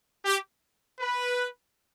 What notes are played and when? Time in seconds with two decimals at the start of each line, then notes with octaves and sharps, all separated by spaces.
0.24 G4
1.00 B4